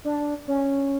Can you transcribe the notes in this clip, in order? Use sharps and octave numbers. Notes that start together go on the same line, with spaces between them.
D4
C#4